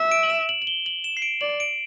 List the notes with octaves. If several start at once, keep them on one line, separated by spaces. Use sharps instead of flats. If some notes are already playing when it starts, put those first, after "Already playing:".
Already playing: E5
D7
F#7
E7
F#7
F#7
G7
F#7
E7
C7
D7
D5 F#7
D7